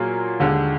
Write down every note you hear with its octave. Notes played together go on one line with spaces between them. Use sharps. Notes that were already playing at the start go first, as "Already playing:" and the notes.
Already playing: A#2 F#3 A#3 F4 G#4
D#2 D3 G#3